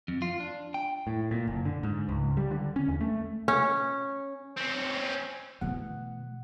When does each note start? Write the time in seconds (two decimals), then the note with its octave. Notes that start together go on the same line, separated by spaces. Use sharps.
0.08 F2
0.22 F4
0.40 D4
0.74 G5
1.07 A2
1.31 A#2
1.47 F#1
1.65 D3
1.83 G#2
2.09 C#2
2.37 G3
2.51 D3
2.76 C#4
2.88 E2
3.01 A3
3.48 C#4
4.57 C4 C#4
5.61 B2 E3 A3 F#5